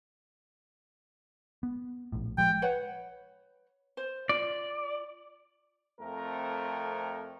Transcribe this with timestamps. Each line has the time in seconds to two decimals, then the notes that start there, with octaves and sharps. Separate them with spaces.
1.63 B3
2.12 A#1 A2
2.38 F3 G#3 G5
2.62 B4 C#5 F#5
3.97 C5
4.29 F4 D5
6.01 F2 A3 C4 A#4